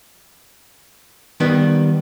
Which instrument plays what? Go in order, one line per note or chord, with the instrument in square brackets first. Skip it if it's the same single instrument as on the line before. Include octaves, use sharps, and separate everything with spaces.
[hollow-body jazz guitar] D#3 G3 B3